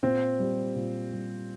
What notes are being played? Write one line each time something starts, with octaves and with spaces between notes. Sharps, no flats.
A#2 C4
G3
A#2
G3